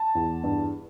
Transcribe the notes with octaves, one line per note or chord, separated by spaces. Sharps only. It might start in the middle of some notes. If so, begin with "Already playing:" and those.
Already playing: A5
E2
G2